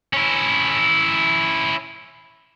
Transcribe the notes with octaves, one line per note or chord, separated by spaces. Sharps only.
C#4 E4